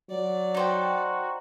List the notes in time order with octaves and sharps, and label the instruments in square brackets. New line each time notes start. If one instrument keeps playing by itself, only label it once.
[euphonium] F#3 [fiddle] D5
[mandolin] D#4 C5 G5 [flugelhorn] F#4